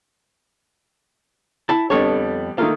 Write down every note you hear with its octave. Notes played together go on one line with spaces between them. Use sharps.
E4 A5
F2 D3 G3 B3 A4 C#5
D#3 A3 A#3 F4